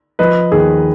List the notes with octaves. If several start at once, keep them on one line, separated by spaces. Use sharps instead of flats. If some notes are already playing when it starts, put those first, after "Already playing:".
F3 B4 D#5
D#2 G#4